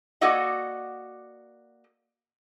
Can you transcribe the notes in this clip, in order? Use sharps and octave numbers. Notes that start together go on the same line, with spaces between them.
A#3 F#4 A4 D5 D#5 F#5